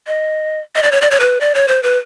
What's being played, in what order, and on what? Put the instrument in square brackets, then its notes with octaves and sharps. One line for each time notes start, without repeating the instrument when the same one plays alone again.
[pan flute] D#5
D#5
D5
C#5
D5
C#5
B4
D5
C#5
C5
B4